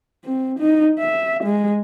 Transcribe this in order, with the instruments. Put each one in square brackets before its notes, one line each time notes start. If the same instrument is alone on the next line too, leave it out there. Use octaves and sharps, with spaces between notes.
[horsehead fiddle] C4
D#4
E5
G#3